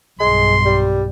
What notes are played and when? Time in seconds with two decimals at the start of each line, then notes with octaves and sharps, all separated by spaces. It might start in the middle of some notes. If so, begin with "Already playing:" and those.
0.20 B1 G2 G#3 C6
0.65 G3